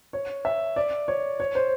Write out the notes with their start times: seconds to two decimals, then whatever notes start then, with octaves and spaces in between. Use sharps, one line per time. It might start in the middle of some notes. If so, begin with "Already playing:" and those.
0.13 C#5
0.45 E5
0.76 D5
1.08 C#5
1.40 C#5
1.55 C5